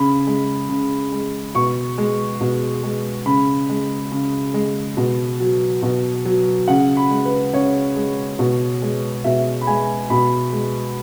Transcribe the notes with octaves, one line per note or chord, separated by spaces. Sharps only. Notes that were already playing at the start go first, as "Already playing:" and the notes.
Already playing: C#3 B5
G#3
C#3
G#3
B2 C#6
G#3
B2
G#3
C#3 B5
G#3
C#3
G#3
B2
F#3
B2
F#3
C#3 F#5
B5
G#3
B4
C#3 C#5
G#3
B2
G#3
B2 E5
B5
G#3 G#5
B2 B5
G#3